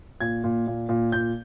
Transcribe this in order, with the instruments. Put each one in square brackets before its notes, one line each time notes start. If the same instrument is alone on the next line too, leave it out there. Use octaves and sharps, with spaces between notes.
[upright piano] A#2 G#6
A#2
A#2
A#2
A#2 G6